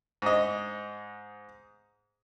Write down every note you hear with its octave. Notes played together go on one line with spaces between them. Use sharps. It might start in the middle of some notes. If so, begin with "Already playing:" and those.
G#2 D#5